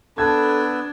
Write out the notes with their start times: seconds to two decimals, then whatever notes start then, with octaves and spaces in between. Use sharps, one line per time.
0.18 B3 D4 A4 B4 A5 E6 G#6